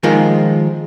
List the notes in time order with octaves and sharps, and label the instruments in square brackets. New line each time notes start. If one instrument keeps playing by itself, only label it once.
[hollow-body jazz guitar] D#3 F3 G#3 A#3 F4 A#4